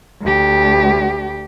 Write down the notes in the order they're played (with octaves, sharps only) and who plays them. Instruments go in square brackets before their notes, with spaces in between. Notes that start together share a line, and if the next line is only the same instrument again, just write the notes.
[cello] D2 G4